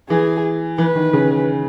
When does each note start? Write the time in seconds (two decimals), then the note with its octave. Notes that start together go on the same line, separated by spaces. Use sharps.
0.09 E3 G#4
0.78 E3 B4
0.95 D#3
1.13 C#3